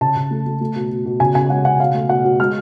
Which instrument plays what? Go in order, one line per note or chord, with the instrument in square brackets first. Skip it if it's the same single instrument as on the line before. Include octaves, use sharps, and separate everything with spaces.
[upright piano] C#3 A5
C#3
A3
A3
A3
B2
B2
B2
C#3 G#5
C#3 G#5
G#3 F#5
C#3 F#5
B2 F5
A3
B2 F#5
B2
G#3 F6